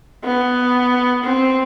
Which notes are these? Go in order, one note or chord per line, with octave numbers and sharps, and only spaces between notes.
B3
C4